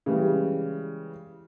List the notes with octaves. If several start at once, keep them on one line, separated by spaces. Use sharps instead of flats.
C#3 E3 G3 G#3